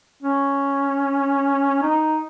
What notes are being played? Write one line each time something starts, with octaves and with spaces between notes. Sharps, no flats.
C#4
D#4